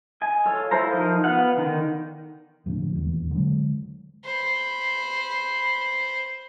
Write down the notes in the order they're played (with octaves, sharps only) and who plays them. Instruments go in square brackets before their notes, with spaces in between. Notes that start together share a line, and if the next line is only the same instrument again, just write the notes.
[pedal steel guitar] D#5 G#5
F4 A4 C#5
E4 F4 A4 C5 A#5
F3 D#4 A#4 D#5
B3 B4 F5 F#5
D3 D#3 D#4
[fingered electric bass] F2 A2 D3
D#1 E2
D3 F#3 G#3
[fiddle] C5 B5